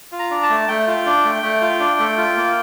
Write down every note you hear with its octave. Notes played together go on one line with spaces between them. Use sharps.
F4
A#5
D4
A5
A3
A3 G5
F4
D4
A3
A3
F4
D4
A3
F4
A#3